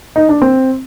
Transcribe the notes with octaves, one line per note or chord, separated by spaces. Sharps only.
D#4
D4
C4